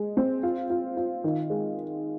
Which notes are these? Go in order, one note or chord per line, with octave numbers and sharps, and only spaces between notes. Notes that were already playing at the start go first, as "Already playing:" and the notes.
Already playing: G#3
C4
F4
F4
F4
D#3
G#3